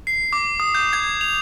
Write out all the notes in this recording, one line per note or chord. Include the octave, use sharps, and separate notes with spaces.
C7
D6
D#6
G6
G#6
F7